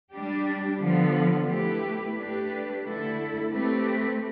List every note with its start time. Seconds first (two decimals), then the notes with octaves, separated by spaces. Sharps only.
0.12 G3 D4 G4
0.80 D3 F3 B3
1.47 A3 E4 G4 B4
2.15 A3 D4 G4 B4
2.82 D3 A3 E4 A4
3.50 A3 C4 G4 B4